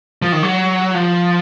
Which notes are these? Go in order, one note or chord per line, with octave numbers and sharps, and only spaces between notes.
F3
D#3
F#3
F3